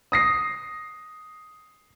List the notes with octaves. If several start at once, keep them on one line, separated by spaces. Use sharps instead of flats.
D#6 A#6 C7